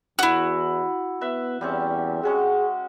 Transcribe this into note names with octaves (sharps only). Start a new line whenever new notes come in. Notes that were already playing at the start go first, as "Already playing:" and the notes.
E2 E4 F#4
B3 B4 E5
E2 G3 C4 C#4
G#3 C#4 F#4 G#4